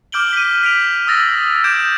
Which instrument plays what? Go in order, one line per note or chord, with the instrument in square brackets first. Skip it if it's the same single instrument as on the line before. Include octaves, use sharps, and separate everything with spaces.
[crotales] D6 F6 G6 D7 F#7 G7
B6 D#7
B6 D7 F7
D#6 E6 A6 A#6
D6 E6 G6 G#6 D7 E7